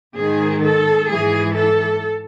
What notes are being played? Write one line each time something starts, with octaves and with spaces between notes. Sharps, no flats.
G#2 D#3 G#4
A4
G#2 E3 G#4
A4